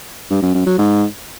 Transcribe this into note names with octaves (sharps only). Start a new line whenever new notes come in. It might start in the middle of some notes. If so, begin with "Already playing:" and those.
G2
F#2
F#2
F#3
G#2